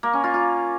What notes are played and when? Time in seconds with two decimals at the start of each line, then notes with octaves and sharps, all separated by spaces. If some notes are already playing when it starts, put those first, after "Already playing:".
0.03 A#3
0.13 C#4
0.24 F4
0.34 F4